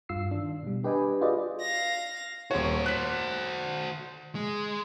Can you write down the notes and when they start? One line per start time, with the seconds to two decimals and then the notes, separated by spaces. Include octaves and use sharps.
0.09 G2 F4 E6 C7
0.31 D#3 D4
0.63 B2 G3
0.84 D4 G4 B4 D#5 G5 G#5
1.21 F4 F#4 G#4 B4 D5 D#5
1.61 F5 A#6
2.51 D#1 F#4 C5 C#5
2.86 F#6 B6
4.35 G#3